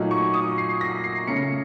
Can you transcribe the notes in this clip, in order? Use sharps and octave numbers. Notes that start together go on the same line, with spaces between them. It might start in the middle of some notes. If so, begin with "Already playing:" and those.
Already playing: A#2 F#3 A3 D#4
C#6
D#6
C7
A#6
C7
C#3 A3 C#4 C#7